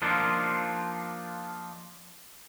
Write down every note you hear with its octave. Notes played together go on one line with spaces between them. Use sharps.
F3 A#3 D4 D#4 F4